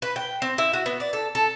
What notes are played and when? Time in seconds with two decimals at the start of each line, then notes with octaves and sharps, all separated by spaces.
0.02 B4
0.16 G5
0.42 C4
0.58 E4
0.74 F#4
0.86 B3
1.00 D5
1.13 A4
1.35 A4